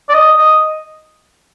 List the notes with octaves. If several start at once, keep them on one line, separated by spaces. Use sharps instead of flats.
D5
D#5
D#5